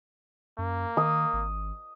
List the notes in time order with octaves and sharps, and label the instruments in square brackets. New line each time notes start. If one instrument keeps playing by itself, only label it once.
[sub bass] F#2 [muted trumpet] A#3
[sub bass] D#3 [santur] D#6
[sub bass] G#1